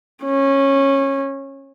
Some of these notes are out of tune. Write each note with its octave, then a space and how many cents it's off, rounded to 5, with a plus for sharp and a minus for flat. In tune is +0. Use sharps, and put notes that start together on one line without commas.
C#4 -20